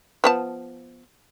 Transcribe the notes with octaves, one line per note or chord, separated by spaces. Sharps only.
F3 B3 A5